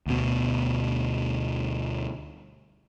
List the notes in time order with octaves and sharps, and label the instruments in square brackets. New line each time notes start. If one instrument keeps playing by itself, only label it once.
[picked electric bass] D2 B2